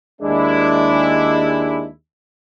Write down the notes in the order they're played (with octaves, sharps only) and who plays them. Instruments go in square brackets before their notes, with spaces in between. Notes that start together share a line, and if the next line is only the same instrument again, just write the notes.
[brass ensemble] D#2 G#3 D4 E4